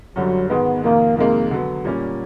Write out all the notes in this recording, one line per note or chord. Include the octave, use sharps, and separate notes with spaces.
F#2 D3 F#3 G3
G#2 D#3 G#3 B3
F2 C3 D#3 A#3
F2 C3 D#3 G#3 A#3
D3 F#3 B3
A#2 G3 A#3 C#4